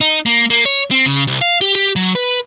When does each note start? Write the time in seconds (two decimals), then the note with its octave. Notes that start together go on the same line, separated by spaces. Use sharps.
0.01 D#4
0.26 A#3
0.50 A#3
0.66 C#5
0.91 C4
1.06 C#3
1.27 C2
1.41 F5
1.61 G4
1.75 G4
1.96 F#3
2.15 B4